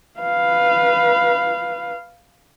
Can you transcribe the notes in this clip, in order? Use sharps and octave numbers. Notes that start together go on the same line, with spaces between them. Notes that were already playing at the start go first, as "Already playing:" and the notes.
B4 F5